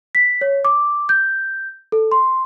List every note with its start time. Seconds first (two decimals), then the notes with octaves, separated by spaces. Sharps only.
0.15 B6
0.41 C#5
0.65 D6
1.09 G6
1.92 A4
2.12 C6